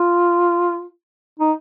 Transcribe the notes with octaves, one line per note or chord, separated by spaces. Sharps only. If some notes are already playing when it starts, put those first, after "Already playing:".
Already playing: F4
D#4